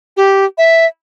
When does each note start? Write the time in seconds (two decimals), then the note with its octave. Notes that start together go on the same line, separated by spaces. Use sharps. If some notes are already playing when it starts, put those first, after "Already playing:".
0.17 G4
0.58 E5